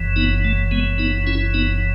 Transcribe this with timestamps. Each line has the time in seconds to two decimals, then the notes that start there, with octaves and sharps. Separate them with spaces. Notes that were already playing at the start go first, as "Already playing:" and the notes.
Already playing: F#1 F#2 E3
0.16 B3 D#4
0.45 A3
0.71 G#3 B3
0.98 B3 D#4
1.27 C#4 E4
1.54 B3 D#4